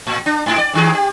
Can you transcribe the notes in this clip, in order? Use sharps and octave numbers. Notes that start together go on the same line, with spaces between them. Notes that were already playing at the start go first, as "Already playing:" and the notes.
A2
D4
G#2 E4
D5
G2 D#3 G#4
G4